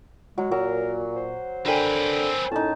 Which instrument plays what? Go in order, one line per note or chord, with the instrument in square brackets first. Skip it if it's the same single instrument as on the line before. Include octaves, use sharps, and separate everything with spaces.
[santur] F#3 [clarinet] G#3
[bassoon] A#2 [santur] F#3 [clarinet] A#4
[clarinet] C5
[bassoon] D3 [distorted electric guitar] C4 B4 [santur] A#4 G5 G#5
[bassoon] A2 [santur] C#4 D#4 [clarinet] A5